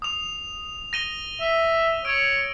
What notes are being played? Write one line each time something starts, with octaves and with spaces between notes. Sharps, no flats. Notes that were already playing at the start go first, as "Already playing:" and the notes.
D#6 F7
A#6 D#7 G7
E5
C#5 E6 D7